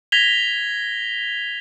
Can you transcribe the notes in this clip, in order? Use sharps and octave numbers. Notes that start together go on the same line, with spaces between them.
G#6 A#6 B6 F7 G7